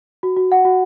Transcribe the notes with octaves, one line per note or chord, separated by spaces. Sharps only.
F#4
F#4
F#5
F#4